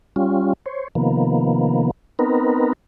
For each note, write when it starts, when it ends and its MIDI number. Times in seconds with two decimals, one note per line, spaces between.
0.16 0.53 55
0.16 0.53 61
0.16 0.53 65
0.66 0.88 72
0.66 0.88 73
0.95 1.91 48
0.95 1.91 51
0.95 1.91 53
0.95 1.91 58
0.95 1.91 59
2.19 2.73 59
2.19 2.73 60
2.19 2.73 63
2.19 2.73 70
2.19 2.73 71